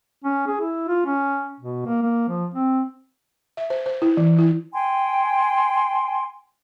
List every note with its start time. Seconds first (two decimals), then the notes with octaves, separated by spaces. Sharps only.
0.25 C#4
0.48 G#4
0.61 E4
0.88 F4
1.06 C#4
1.60 B2
1.86 A#3
2.02 A#3
2.28 F3
2.54 C4
3.57 E5
3.70 C5
3.86 C5
4.02 E4
4.17 E3
4.39 E4
4.74 G5 G#5 C6